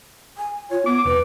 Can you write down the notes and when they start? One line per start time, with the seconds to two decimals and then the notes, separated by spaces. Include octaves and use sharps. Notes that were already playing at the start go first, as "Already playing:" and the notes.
0.38 G#5
0.71 F4 C#5
0.86 B3 D6
1.05 E1 B4